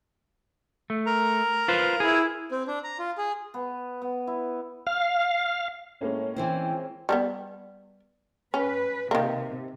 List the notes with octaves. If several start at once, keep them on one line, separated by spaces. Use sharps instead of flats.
A3
A#4 A#5
F4 B4 C5
E4 G#4
C4
D4
A#5
F4
G#4
B3
B3
E4
F5
A2 G#3 A#3 C#4
E3 C4 E4 C5 G5
G3 G#3 B3
C#4 B4
C3 D#3 A#3